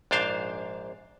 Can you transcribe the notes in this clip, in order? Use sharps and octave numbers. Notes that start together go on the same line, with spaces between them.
A#1 G#2 D4 C5 F5 A5